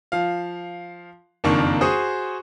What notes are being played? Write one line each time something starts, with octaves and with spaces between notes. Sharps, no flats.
F3 F5
F#1 F2 D#3 A#3 D4 C#6
F#4 G#4 C5 C#6 D#6